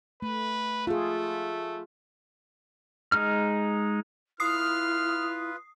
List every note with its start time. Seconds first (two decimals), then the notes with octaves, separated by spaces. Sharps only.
0.22 A3 B4
0.87 A3 F4 G#4
3.12 G#3 D#4 F6
4.40 E4 F4 B4 D#6 F6 C7